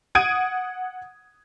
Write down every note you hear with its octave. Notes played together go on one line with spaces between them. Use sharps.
F#5 D#6 G#6 D7 D#7